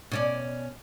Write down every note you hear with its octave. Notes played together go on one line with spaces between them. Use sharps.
B2 C#4 D5